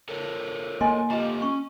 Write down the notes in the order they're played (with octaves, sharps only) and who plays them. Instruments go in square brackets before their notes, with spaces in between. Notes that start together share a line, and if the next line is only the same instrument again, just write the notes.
[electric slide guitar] A4 A#4 C#5
[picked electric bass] A#3 [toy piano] D#5 G#5 C6
[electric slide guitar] A3 F4 G4 [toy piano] D#5 A#5
[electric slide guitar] C#4 [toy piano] C#6